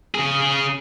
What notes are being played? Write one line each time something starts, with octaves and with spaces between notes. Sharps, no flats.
C#3 G#4